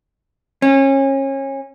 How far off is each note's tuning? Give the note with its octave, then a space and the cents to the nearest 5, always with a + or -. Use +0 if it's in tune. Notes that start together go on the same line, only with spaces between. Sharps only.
C#4 -30